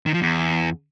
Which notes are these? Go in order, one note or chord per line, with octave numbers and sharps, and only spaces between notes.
D#3
F3
E2